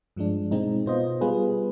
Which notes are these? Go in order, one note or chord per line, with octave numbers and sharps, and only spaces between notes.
G2 F3 G#3 D4
B2 G#3 C4 D#4
B2 B3 F4 C5 D#5
G3 B3 F4 G#4 B4